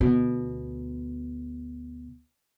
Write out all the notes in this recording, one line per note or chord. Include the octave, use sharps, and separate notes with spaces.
D2 B2